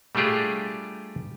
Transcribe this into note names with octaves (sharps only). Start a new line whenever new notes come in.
G3 A3 D4 F4 G4 G#4